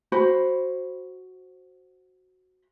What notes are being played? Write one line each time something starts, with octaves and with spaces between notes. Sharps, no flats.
F#4 C5 B5